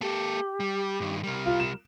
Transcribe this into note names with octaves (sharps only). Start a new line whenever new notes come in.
A#3 G4 A4
G3
G2 D#3
C2 G3 A#4
F4
E7